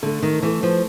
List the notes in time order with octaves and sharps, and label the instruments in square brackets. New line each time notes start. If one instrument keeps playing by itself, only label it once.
[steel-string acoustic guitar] D3 [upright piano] A3
[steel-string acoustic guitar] D#3
[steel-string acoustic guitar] E3 [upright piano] A3
[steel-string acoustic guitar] F3